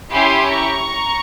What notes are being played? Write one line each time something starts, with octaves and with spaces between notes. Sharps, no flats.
C#4 E4 G4 G#5 C6
A#5 C#6